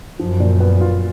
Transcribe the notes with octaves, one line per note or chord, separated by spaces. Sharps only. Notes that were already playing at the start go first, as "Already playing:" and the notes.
F#2 F3
A#2
B3
F4